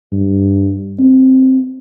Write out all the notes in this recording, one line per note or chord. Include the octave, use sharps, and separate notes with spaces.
G2
C4